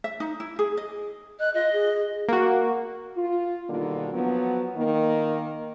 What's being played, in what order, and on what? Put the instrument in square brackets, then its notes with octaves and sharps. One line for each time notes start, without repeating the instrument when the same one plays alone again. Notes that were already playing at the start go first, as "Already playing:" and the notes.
[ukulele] E5
D#4
E4
G#4
D#5
[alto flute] D#5 [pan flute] F#6
[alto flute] F4 [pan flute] D#5
[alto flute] G#4
[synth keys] A#3 F#4
[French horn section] F4
B2 D3 D#3 G3 A#3
F3 F#3 B3
D#3 A#3